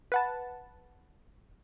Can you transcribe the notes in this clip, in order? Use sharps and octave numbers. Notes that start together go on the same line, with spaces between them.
B4 F#5 A5